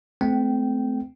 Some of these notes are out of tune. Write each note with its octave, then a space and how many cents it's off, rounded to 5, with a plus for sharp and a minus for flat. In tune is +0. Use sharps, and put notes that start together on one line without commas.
A3 -25 C4 -30 G5 -15